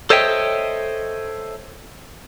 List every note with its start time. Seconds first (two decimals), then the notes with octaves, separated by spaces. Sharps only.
0.10 A4 C5 C#5 D#5 E5 G5